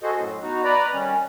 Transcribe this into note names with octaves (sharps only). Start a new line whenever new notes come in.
F#4 G#4 A4 C5 D#5
F#2 A2
B3 D#4 F#4
B4 D5 A#5 B5
D#3 G3 C#4